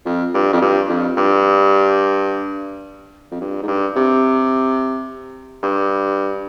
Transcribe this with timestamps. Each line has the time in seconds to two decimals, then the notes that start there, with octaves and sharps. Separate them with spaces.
0.06 F2
0.34 G2
0.53 F2
0.61 G2
0.89 F2
1.17 G2
3.32 F2
3.41 G2
3.63 G#2
3.68 G2
3.96 C3
5.63 G2